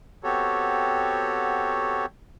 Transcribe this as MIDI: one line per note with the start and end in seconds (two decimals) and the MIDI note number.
0.24 2.06 59
0.24 2.06 60
0.24 2.06 66
0.24 2.06 67
0.24 2.06 69
0.24 2.06 73